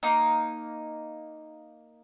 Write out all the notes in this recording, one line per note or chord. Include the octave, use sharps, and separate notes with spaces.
A#3 D#4